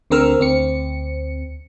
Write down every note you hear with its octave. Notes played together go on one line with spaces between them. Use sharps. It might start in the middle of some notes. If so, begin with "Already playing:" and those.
D2 D3 C4 A#4 E6 F6
D2 C4 C#7